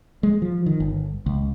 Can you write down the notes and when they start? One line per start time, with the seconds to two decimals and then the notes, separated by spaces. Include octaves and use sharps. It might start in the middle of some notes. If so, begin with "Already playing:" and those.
0.23 G#3
0.42 F3
0.66 D#3
0.80 G1
1.26 C#2